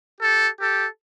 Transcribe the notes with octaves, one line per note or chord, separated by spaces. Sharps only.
G4 A4
G4 A4